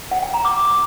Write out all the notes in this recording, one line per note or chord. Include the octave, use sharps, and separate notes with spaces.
F#5
G5
A#5
D6